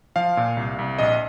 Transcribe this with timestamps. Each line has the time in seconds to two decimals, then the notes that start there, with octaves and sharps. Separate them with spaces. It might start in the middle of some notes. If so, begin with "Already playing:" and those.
0.16 F3 F5
0.37 A#2
0.57 C2
0.79 C2
0.98 A#1 D#5